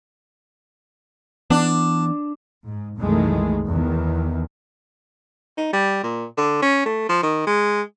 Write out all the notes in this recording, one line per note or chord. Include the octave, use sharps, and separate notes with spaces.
E3 B3 D4
G#2
C2 F#2 D#3 E3 G#3 A3
E2 D#3 E3
D#4
G3
A#2
D3
C#4
A3
F3
D#3
G#3